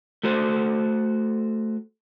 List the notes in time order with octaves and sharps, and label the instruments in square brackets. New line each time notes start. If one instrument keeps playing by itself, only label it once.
[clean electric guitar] A3 F#4 A4 C5